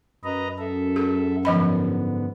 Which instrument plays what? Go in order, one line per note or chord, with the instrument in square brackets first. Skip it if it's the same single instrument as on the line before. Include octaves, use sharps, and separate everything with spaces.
[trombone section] F#2 [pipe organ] B4 D#5 A#5
[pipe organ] A4 E5
[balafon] G#4
[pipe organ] G#2 D3 B3 [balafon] F3 D#5 B5